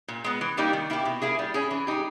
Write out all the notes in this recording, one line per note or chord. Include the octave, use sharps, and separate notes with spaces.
A#2
G#3 B3
E3
G3 A#3 D#4 G4
D#3
A#3 E4 G4
B2
A#3 E4 G#4
G3
C#4 E4 G#4
E3
G#3 D#4 G4